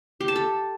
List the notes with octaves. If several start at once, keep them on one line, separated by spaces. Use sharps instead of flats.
G4
A5
A4